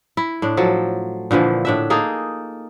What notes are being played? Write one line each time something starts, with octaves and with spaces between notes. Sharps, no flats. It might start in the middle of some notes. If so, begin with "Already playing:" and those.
E4
A2 D4
F3 F#3 A4
A#2 D3 E3 F3
A2 D4 E5
A#3 D#4 G#4 A4